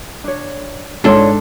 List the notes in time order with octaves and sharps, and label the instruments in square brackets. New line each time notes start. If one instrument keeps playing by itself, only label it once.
[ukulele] D4 C#5
[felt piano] G#2 C6 [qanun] D4 A4 [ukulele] F4 C#5 D5